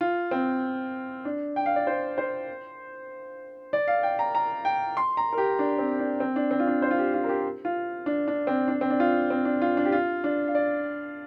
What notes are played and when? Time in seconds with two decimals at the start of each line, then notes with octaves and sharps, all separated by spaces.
0.01 F4
0.31 C4
1.25 D4
1.56 G5
1.66 F5
1.76 D5
1.87 C5
2.18 C5
3.73 D5
3.88 F5
4.03 G5
4.19 A#5
4.35 A#5
4.65 G5
4.97 C6
5.17 A#5
5.33 A#4
5.38 G4
5.59 D4
5.78 C4
5.99 D4
6.20 C4
6.36 D4
6.51 C4
6.60 F4
6.67 D4
6.82 C5
6.91 F4
6.98 G4
7.14 F4
7.24 A#4
7.29 G4
7.65 F4
8.06 D4
8.28 D4
8.47 C4
8.68 D4
8.81 C4
8.90 D4
9.00 F4
9.30 C4
9.45 D4
9.62 F4
9.77 D4
9.85 G4
9.92 F4
10.24 D4
10.48 F5
10.55 D5